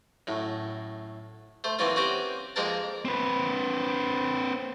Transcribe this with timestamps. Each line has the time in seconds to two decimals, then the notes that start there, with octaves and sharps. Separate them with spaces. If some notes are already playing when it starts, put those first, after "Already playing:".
0.27 F#2 A2
1.64 A3 C5
1.79 E3 F#3 A#3 C4 C#4 F4
1.96 C4 C#4 F#4 G4 C5
2.56 F2 G#3 A#3 C4 A#4 A5
3.05 C4 B4